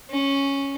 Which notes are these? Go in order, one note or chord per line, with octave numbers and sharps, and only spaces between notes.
C#4